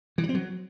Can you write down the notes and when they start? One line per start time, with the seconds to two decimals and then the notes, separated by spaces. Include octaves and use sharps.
0.18 E3
0.24 F#3
0.29 C4
0.35 F#3